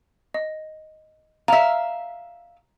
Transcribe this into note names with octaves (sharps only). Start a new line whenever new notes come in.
D#5
E5 F5 A#5